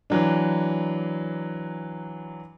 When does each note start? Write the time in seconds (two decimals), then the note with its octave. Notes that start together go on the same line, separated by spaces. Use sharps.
0.10 E3 F#3 D4